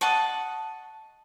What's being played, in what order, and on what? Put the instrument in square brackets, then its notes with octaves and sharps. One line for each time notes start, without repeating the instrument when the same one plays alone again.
[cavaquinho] D#5 F#5 A5 C#6